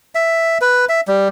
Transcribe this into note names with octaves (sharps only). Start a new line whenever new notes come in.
E5
B4
E5
G3